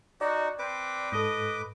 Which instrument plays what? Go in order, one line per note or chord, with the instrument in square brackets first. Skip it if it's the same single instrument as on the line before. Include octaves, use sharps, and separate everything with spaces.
[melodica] D#4 [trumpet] F#4 [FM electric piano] D5
[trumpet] C4 [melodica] B4 D6
[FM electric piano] G#2 A4 [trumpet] D#5